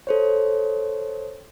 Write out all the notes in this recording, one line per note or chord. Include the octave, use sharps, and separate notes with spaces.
A4 C5 C#5